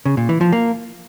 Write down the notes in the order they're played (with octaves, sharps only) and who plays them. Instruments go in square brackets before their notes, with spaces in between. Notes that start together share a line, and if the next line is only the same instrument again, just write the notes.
[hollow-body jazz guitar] C#3
A#2
E3
F3
A#3